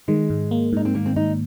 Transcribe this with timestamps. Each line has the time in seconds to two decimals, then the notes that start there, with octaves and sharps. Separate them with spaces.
0.08 D#3 G#3
0.30 G#2
0.51 A#3
0.73 G#2 D#4
0.85 C4
0.94 D#3 A#3
1.06 C4
1.16 G#2 D#4